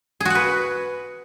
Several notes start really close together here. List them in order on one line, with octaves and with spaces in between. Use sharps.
G#4 F#4 F#5 B4